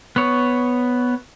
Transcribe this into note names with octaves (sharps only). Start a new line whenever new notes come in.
B3 C#5